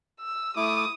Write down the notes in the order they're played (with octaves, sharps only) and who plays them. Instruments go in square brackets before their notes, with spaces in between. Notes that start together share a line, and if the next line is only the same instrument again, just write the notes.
[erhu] E6
[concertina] A3 E4 D6 [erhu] D#6